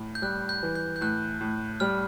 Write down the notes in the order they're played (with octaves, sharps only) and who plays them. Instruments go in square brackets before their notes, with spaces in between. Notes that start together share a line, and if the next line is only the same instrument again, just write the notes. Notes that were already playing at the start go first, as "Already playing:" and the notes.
Already playing: [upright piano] A2
[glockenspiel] G6
[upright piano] G3 [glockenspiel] F#6
[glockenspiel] G6
[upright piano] E3
[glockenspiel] G6
G6
[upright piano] A2 [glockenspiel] F#6
[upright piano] A2
[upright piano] G3 [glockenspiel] F6